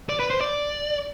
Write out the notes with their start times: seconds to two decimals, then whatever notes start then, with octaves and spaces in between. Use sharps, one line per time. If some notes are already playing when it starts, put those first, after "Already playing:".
0.09 D5
0.20 B4
0.30 C5
0.41 D5